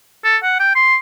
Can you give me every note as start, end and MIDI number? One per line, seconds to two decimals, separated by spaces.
0.24 0.37 69
0.43 0.56 78
0.59 0.74 79
0.75 0.96 84